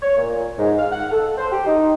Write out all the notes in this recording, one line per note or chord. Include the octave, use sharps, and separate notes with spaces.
C#5
A#2
G#2
F5
F#5
A4
C5
G4
D#4